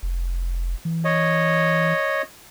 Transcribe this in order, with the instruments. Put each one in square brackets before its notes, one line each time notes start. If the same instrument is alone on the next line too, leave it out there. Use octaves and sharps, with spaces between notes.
[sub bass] F1
E3
[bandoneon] C#5 D#5